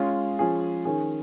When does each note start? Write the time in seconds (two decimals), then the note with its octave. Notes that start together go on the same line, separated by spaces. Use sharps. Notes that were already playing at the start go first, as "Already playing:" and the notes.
Already playing: G#3 C#4 F4
0.39 F3 C#4 G#4
0.85 D#3 C#4 G#4